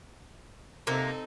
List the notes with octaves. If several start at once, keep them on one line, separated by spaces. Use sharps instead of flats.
C3 A#3 C4 D#4 A4 A#4